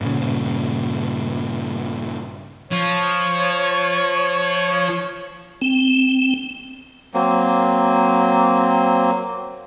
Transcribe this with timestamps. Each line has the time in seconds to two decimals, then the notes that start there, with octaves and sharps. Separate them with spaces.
0.01 G2 A#2 C#3
2.72 F3 C#5
5.61 C4
7.14 F#3 A#3 C4